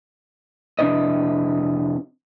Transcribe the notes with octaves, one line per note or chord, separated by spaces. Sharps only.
F2 C3 D4 E4 B4 D#5